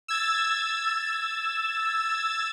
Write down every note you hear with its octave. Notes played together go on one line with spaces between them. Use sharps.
E6 G#6 A6